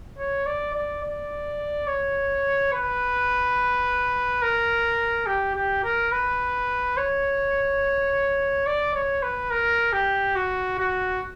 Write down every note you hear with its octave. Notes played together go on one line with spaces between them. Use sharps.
C#5
D5
D5
D5
C#5
B4
A#4
G4
G4
A#4
B4
C#5
D5
C#5
B4
A#4
G4
F#4
F#4